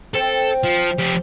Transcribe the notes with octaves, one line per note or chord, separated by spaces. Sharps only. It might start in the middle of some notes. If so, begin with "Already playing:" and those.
C4 A4
F3
F3 G4